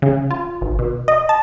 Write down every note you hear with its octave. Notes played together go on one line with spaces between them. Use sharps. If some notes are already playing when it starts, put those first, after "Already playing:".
C#3
F4
G#1
B2
D#5
A5